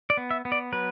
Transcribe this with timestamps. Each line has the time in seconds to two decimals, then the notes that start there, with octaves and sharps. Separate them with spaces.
0.10 D5
0.17 B3
0.31 E5
0.45 B3
0.52 D5
0.72 F#3 B4